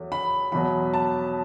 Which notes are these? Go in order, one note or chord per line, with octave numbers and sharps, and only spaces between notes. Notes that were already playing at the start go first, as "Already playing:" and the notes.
Already playing: E2 F#3 A3
B5
E2 B2 F#3 B5
A5